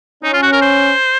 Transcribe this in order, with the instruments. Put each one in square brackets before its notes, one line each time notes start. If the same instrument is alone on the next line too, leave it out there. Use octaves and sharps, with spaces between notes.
[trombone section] C#4 [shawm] D#4
[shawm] F4
F#4
A#4
C5